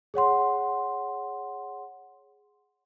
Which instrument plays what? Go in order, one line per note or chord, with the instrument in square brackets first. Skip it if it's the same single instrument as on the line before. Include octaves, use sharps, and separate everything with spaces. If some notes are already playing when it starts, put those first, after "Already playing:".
[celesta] G#4 C#5 F#5 C6